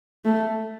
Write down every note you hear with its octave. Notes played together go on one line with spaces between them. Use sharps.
A3